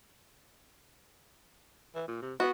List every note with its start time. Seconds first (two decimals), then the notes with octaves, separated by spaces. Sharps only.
1.95 E3
2.08 A#2
2.22 C3
2.40 B3 F#4